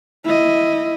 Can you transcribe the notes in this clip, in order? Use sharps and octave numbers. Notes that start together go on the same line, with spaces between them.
E4 D#5